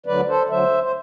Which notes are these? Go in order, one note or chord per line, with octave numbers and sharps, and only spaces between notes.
D2 D3 F#3 B4 D5
A4 C5
D2 D3 F#3 C5 E5
C5